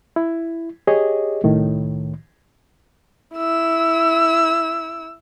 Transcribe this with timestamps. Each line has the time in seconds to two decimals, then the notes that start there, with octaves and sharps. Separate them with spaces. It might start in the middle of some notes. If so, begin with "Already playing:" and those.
0.16 E4
0.87 G4 G#4 C#5 D#5
1.43 C2 A2 D#3
3.36 E4 E6